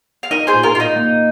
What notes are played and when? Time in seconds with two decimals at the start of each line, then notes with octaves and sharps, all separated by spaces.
0.23 F5
0.31 D#4 A#4 D#5
0.47 G#4 C5
0.53 A#2
0.63 F4 A#4
0.74 A#2 F4
0.80 D#4
0.96 A#3